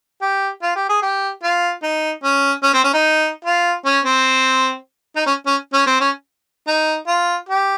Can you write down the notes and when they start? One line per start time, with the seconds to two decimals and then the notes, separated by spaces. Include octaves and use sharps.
0.21 G4
0.62 F4
0.75 G4
0.89 G#4
1.02 G4
1.43 F4
1.83 D#4
2.24 C#4
2.63 C#4
2.73 C4
2.84 C#4
2.94 D#4
3.45 F4
3.85 C#4
4.05 C4
5.16 D#4
5.26 C#4
5.46 C#4
5.73 C#4
5.87 C4
6.00 C#4
6.68 D#4
7.07 F4
7.49 G4